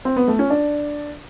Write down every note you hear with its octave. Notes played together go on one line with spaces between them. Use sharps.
C4
B3
A3
C#4
D4